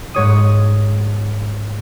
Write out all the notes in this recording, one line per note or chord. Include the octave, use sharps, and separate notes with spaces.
G#2 C#5 D#6